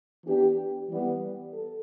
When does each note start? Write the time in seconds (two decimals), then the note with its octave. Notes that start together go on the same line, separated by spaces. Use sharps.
0.25 E3 B3 D4 G4
0.88 E3 G3 B3
1.52 A4